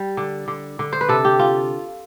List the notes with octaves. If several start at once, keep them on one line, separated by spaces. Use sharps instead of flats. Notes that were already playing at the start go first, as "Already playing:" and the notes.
Already playing: G3
D3
D3
D3
C5
B4
C3 A4
G4
F4